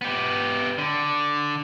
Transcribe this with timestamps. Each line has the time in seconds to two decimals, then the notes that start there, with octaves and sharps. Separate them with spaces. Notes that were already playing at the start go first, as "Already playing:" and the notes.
0.01 B3 G4
0.78 D3